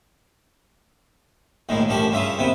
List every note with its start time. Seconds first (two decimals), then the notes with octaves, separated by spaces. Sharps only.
1.69 A#1 A2 D#3 G#3
1.88 A1 F#2 F3 D4 G4 C#6
2.11 G2 C#3 F4 E5 D#6
2.37 D#2 C3 B3 D#6